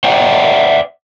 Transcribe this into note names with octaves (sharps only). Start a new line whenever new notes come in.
D5 E5 F#5 G5